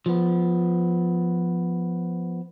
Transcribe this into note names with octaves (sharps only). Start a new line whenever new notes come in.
F3 B3